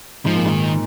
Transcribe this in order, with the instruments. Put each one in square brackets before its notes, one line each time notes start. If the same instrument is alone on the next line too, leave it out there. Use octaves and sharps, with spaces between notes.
[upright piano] G#2 [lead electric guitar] F3
[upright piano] A#2
[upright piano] G#2 [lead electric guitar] D#3